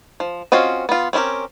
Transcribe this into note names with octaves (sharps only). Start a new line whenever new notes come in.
F3
C4 C#4 F4 F#4 D#5
B3 F4
C4 C#4 E4 G4 A#4